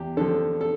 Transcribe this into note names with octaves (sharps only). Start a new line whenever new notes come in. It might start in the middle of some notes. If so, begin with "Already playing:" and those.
Already playing: E2 G4
D3 F3 A4
A4